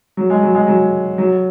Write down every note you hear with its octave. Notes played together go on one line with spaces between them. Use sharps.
F#3
G#3
F#3
G#3
F#3
F#3